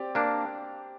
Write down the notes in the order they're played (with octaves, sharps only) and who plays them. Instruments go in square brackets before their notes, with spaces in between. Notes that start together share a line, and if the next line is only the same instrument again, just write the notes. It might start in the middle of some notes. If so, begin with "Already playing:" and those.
Already playing: [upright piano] C4 G4 D5
[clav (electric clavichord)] A#3 D4